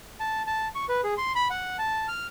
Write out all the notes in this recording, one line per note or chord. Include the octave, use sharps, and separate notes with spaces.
A5
A5
C#6
B4
G#4
C6
B5
F#5
A5
F6